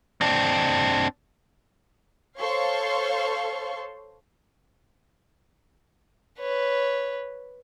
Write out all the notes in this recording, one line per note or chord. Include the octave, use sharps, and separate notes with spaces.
C4 D4
A4 C5 C#5 F5 C6 C#6
B4 C#5